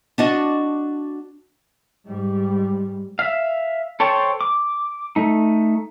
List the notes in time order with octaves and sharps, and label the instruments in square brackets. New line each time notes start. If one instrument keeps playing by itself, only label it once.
[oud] D4 F#4 D#5
[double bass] G#2 G3
[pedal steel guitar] E5 F5
A4 C5 C#5 G5 A5
D6
A3 D#4